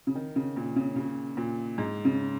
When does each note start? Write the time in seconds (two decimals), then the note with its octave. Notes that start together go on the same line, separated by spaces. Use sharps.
0.07 C#3
0.15 D#3
0.36 C#3
0.56 A#2
0.76 C#3
0.96 C#3
1.37 A#2
1.78 G#2
2.05 C#3